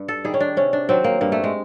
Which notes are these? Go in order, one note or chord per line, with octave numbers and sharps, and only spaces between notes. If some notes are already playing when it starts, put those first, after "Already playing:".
Already playing: G2
A4
D#3 G3 G#4
C#4
D4
C3 C#4
D4
D#3 F#3 C4
A#3
G2 A#3
A3
G#3